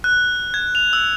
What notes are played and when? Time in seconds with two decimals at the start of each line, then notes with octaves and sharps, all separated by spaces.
0.04 F#6
0.54 G#6
0.75 F7
0.93 E6